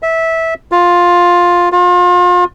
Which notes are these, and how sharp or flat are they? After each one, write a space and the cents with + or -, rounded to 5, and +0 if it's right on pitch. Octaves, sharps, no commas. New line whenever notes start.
E5 -15
F4 +10
F4 +35